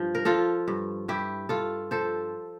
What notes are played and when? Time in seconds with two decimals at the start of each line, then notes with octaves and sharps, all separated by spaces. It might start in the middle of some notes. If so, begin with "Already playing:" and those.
Already playing: G2 F3
0.15 A#4
0.25 F3 F4 A4
0.68 G2
1.08 G2 E4 G4
1.49 G2 F4 A4
1.91 F3 A4 C5